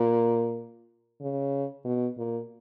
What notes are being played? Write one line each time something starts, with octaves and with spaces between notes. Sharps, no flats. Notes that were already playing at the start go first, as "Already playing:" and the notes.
Already playing: A#2
C#3
B2
A#2